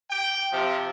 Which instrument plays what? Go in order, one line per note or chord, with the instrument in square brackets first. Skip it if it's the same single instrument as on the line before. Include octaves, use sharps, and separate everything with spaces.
[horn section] G5
C3 F3